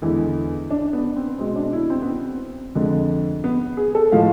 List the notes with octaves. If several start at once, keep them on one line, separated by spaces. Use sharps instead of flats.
E2 D3 G#3 E4
D4
B3
C4
B2 G#3 C4
D4
E4
C4
B3
C4
F2 D3 G#3
B3
G#4
A4
A2 F3 G#3 F5